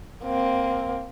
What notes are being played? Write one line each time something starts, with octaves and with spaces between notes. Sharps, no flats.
A#3 C4